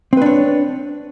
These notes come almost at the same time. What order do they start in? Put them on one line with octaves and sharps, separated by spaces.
C4 B4 D4 C#5